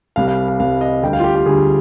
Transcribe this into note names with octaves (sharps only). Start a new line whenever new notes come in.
C2 C3 G3 F5
F5
F5
C2 C3 G3 F5
D#5
D2 D3 G3 G5
F5
F4
G4
G4
D2 D3 G3 G#4